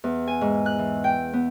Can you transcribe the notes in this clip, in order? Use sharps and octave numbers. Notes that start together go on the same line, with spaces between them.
E2
G#5
G#2
F#6
E3
G5
B3